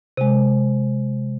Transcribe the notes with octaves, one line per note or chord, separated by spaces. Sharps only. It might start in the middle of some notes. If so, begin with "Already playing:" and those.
C3 G#3